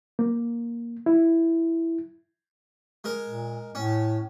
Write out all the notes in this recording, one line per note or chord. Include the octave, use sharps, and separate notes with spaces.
A#3
E4
G#3 A#4
A#2
A2 C#4